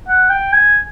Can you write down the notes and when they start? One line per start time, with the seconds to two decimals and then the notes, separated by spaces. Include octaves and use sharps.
0.08 F#5
0.30 G5
0.53 G#5